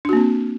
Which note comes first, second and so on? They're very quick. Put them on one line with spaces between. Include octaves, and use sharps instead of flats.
D4 F#4 A#3 C4